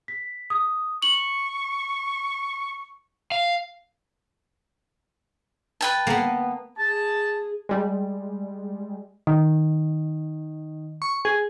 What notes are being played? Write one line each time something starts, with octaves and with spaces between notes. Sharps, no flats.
B6
D#6
C#6 F#7
F5
B4 G5 A5
A#3 B3
G#4 A5
G3 G#3
D#3
C#6
G#4